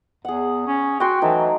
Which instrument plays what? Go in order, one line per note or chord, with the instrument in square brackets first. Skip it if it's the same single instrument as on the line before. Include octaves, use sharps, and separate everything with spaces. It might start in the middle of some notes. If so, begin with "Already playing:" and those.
[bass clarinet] E2 [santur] G#4 F#5
[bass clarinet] C#4
[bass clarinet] F#4 [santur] G5 C6
[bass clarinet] E3 [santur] F#3 A3 D#4